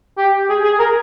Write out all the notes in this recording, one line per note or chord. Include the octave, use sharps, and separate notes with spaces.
G4
G#4
G#4
A#4